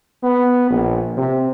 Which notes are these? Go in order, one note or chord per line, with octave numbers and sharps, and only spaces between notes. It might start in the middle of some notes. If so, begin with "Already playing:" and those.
B3
A#1
C3